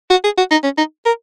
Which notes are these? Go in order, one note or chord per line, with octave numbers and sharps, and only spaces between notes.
F#4
G#4
F#4
D#4
C#4
D#4
A#4